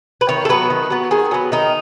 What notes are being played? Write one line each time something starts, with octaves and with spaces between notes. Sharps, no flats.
B4
D#3 C#5
A4
F#3 B3 B4
D#3
F#3 B3
D#3 G#4
F#3 B3
D#3 D#4